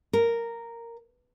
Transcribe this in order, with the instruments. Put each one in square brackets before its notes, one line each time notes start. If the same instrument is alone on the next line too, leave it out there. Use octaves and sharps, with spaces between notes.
[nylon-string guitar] A#4